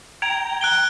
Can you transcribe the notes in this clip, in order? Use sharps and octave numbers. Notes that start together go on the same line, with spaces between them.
G5 A#5 G#6
F#6 D7 G7